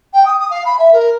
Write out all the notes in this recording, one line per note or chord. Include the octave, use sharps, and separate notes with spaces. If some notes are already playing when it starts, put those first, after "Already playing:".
G5
D#6
D#6
F5
B5
E5
A#4